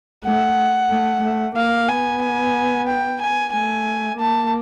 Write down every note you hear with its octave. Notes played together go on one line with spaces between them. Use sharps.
A3 F#5
A3
A3
A#3 F5
B3 G#5
G#5
G5
G#5
A3 G#5
A#3 A5